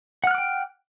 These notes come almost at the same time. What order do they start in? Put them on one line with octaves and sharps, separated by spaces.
F#5 F6 F#6 D6 G5